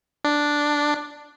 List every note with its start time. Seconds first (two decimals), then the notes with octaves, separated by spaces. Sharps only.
0.24 D4